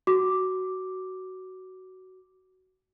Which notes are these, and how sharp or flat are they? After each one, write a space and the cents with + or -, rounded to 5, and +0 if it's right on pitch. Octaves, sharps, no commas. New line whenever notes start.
F#4 +15 D6 +0